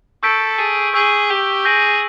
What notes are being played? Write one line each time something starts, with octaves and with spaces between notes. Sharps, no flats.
A4 C#6 E6 G6 B6 D7
G#4
G#4 C#6 E6 G6
G4
G#4 G6 A#6 D7 F#7